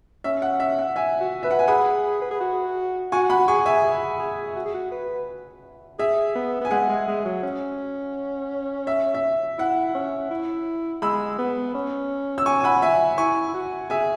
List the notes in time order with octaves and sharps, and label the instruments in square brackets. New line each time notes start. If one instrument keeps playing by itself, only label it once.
[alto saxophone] C#4 [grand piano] E5
[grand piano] F#5
E5
F#5
E5 G#5
[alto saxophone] F#4
[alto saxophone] B4 [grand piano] E5
[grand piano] F#5
G#5
[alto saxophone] G#4 [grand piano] F#5 B5
[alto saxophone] B4
G#4
F#4
[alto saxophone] F#4 [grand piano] G#5 C#6
[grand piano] F#5 B5
[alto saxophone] F#4
[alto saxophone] G#4 [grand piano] G#5 C#6
[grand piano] E5 G#5
[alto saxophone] G#4
G#4
F#4
G#4
F#4
B4
[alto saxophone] G#4 [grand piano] E5
[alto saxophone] B3
[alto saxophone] B3 [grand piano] G#5
[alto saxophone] G#3 [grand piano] F#5
[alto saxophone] G#3
G#3
F#3
C#4
[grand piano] E5
E5
[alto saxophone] E4 [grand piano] F#5
[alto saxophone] C#4
E4
[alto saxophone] G#3 [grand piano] B5 E6
[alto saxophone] B3
C#4
[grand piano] E6
G#5 C#6
G#5
F#5 B5
E5 G#5
[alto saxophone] E4 [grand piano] G#5 C#6
[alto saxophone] E4
F#4
[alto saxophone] G#4 [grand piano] E5 G#5